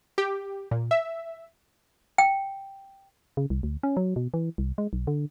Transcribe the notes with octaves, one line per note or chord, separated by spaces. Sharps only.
G4
A#2
E5
G5
C#3
C2
D2
C#4
F#3
B2
E3
C2
G#3
B1
D3